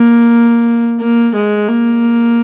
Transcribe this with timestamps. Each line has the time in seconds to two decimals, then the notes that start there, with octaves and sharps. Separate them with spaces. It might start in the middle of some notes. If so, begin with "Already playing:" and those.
Already playing: A#3
1.00 A#3
1.35 G#3
1.68 A#3